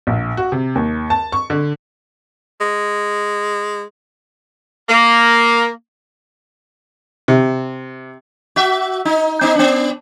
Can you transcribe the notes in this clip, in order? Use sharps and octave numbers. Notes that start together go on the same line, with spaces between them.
A#1
F#4
C3
D#2
A5
C#6
D3
G#3
A#3
C3
F#4 E5
D#4
B3 D#4
B3 D4